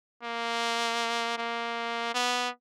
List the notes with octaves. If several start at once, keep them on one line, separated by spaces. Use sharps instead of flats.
A#3
A#3
B3